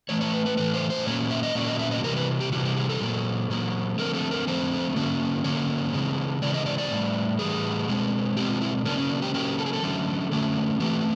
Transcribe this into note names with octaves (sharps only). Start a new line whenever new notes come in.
A2 E3 A3 C#5
C#5
B4
B4
A2 E3 A3 B4
C5
C5
A#2 F#3 A#3 C#4 C#5
E5
D#5
A#2 F#3 A#3 C#4 D5
D#5
E5
D#5
C3 E3 G3 A#4
B4
G4
C3 E3 G3 F#4
G4
G#4
A4
A#2 F#3 A#3
A#2 F#3 A#3
D3 F3 A3 C4 A#4
A4
A#4
D3 F3 A3 C4 C5
D3 F#3 A#3 C#4
D3 F#3 A#3 C#4 C#5
C#3 E3 G#3 C4
C#3 E3 G#3 C4 D5
D#5
D5
D5
A2 E3 G3
A2 E3 G3 G#4
B2 G#3 C4
B2 G#3 C4 G4
F4
E4
C#3 F#3 A#3 C#4 D4
C#4
D4
G4
C#3 F#3 A#3 C#4 G4
A4
G#4
A4
D3 F#3 A3 C#4
D3 F#3 A3 C#4
E3 A3 C4 G4